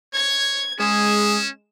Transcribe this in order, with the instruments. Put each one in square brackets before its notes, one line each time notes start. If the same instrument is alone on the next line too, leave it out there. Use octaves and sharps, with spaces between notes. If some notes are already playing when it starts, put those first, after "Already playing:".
[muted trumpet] C#5 [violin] G#6
[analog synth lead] G#3 [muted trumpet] C#4 [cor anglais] G#4 [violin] E7